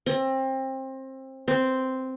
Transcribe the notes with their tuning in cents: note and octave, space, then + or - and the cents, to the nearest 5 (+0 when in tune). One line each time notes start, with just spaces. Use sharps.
C4 +25
C4 -5